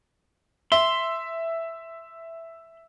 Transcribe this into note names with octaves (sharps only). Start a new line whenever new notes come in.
E5 C6